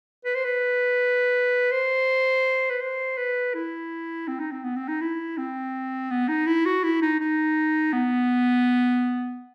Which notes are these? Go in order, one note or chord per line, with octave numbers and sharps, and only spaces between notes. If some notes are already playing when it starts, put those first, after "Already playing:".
B4
C5
B4
C5
B4
C5
B4
E4
C4
D#4
C4
B3
C4
D#4
E4
C4
B3
D#4
E4
F#4
E4
D#4
D#4
B3